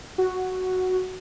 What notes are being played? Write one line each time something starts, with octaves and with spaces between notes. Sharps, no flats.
F#4